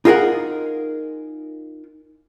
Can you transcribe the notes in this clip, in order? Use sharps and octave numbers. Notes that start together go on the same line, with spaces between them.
D#4 F4 G#4 A#4 F#5